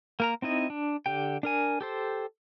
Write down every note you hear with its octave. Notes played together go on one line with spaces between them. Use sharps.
A#3 A#4 A#5
C4 D#4 E4 D#5
D4
D3 G4 G5
D4 A#4 G#5
G4 A4 C5